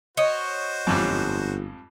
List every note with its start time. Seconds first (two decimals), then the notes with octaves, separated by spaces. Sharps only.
0.17 F#4 C5 C#5 D#5
0.87 G1 F2 G#2 G3